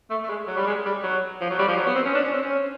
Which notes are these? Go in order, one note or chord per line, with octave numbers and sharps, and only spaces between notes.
A3
A3
G#3
F#3
G3
G#3
G3
F#3
F3
F#3
G3
F3
F#3
B3
C4
C#4
D4
C#4
C4
C#4